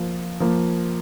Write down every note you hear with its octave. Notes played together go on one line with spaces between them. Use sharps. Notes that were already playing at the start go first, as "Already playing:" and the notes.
Already playing: F3 A#3 F4
F3 A#3